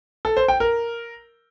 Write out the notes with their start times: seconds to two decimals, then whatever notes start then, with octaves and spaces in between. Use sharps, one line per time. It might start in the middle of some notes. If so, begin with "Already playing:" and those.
0.25 A4
0.37 C5
0.48 G5
0.60 A#4